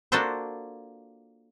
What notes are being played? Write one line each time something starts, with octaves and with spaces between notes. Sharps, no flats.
A#3 D4 F4 F#4 A4 C5